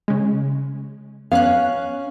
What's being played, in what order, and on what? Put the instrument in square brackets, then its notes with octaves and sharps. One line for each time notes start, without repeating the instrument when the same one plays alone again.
[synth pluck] C#3 G#3
[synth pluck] B3 F#6 [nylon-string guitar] C#4 F5